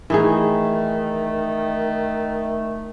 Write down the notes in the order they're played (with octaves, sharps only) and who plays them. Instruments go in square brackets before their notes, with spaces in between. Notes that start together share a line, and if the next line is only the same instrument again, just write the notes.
[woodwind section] D#3 A3 [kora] E3 D#4 G#4